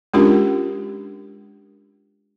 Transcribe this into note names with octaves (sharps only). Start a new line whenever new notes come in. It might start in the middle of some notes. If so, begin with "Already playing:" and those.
G#3 C#4 D4 F4 G4 A#4